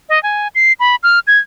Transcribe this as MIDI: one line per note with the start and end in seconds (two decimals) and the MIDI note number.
0.09 0.21 75
0.23 0.48 80
0.55 0.73 96
0.80 0.96 83
1.03 1.19 89
1.27 1.39 92